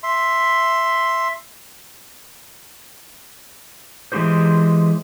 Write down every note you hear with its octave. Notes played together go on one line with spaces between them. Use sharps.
E5 C6
E3 G#3 B3 F#4 G4 C5